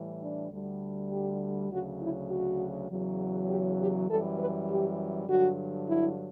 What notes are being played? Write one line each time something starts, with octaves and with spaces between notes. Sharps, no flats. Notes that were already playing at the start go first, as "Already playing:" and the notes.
Already playing: A2 E3 G3
D4
D2 D3 G3
G4
D2 C#3 F#3 F#4
E4
F#4
E2 C#3 F#3
G4
G4
F#2 E3 G3 A4
B4
G4
G2 D3 F#3 F#4
E4